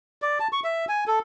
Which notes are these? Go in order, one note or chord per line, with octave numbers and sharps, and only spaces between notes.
D5
A5
C#6
E5
G#5
A4